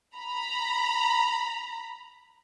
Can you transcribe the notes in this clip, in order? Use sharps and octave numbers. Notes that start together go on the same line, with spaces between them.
A#5 B5